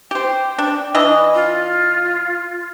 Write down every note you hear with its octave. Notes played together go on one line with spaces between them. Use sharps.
G4 C5 G5
D4
E3 D4 D#5
F4